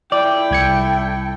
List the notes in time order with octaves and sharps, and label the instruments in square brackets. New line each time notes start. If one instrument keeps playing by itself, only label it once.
[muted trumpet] E4 [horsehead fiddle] A4 G5 [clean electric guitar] D5
[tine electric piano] C2 G#6 C#7